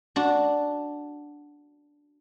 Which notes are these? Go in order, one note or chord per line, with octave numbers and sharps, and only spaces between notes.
D4 F#4